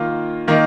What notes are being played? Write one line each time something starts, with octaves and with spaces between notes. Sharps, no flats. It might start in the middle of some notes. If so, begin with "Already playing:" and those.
Already playing: D#3 A#3 F4
D#3 A#3 D#4